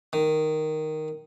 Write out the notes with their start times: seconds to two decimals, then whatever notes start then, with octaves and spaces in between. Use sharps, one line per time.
0.13 D#3